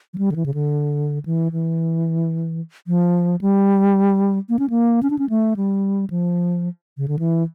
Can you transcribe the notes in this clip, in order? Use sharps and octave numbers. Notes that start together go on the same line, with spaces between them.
F3
G3
D3
E3
C#3
D3
E3
E3
F3
G3
A#3
C#4
A#3
C#4
D4
C#4
A3
G3
F3
C#3
D3
E3